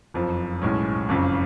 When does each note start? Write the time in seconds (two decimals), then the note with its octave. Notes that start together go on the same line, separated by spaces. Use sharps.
0.14 F#1 F2 F3
0.62 B1 A2 G#3 C#4
1.09 F#1 F2 C#3